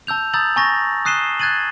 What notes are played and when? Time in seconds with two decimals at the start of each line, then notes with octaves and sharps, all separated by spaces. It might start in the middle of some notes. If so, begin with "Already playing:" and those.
0.07 A5 E6 G6 F7
0.33 A#5 D#6 E6 G6 A6 F#7
0.56 G#5 A#5 C#6 A6 A#6
1.05 D#6 F#6 C7 D#7 E7 G7
1.40 F#6 G#6 A6 D#7 F#7